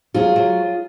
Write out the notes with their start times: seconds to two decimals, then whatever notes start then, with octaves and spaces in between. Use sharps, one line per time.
0.14 F#3 F4 G#4
0.36 F#3